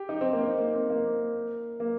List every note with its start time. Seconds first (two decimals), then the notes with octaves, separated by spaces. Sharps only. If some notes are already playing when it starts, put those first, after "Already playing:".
Already playing: G4
0.09 D#4
0.21 C4
0.33 A#3
0.44 D#4
0.58 A#3
0.75 C4
0.90 A#3
1.80 A#3